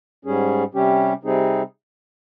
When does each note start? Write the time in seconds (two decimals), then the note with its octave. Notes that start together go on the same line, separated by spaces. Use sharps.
0.25 G#2 G3 C#4 G#4
0.74 C3 G3 C#4 G4
1.23 C3 G3 C4 D#4 G#4